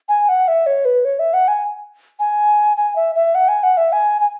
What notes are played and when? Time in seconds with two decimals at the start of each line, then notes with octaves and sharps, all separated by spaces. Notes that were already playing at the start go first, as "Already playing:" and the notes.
0.08 G#5
0.29 F#5
0.48 E5
0.66 C#5
0.85 B4
1.05 C#5
1.19 E5
1.33 F#5
1.48 G#5
2.19 G#5
2.77 G#5
2.96 E5
3.15 E5
3.35 F#5
3.48 G#5
3.63 F#5
3.77 E5
3.92 G#5
4.20 G#5